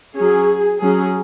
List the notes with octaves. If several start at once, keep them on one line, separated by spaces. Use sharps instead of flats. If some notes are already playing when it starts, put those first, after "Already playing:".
F#3 C#4 G#4
F#3 C#4 G#4